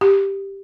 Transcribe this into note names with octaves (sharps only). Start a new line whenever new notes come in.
G4